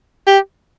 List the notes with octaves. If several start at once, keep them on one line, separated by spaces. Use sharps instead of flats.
G4